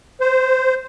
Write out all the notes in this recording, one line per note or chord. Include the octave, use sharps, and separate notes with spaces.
C5